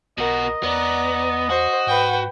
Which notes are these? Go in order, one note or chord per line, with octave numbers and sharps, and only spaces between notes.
B1 B2 F#4 A#4 D#5
E2 B3 D5 A#5
F#4 C5
G#2 B4 G5